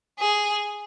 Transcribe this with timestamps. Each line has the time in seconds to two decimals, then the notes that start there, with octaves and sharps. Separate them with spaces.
0.20 G#4